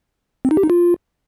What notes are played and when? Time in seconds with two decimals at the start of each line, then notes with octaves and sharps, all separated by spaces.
0.45 C4
0.51 D#4
0.57 G4
0.63 D#4
0.70 F4